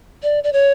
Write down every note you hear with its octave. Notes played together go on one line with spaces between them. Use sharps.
D5
D5
C#5